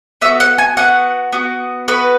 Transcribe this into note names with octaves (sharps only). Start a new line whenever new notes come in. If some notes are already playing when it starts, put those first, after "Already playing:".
B3 F#4 E5
F#5
G#5
B3 F#4 F#5
B3 F#4
B3 F#4 B4